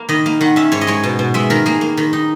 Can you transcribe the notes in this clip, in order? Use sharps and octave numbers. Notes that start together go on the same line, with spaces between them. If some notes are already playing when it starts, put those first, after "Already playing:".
Already playing: A#3
D#3 D#5
A#3
D#3 F#5
C#4 E5
G#2 C#5
D#5
G#3 C#5
B2
B2
G#3 E5
D#3 A#4
A#3 G#4
A#3
D#3
D#4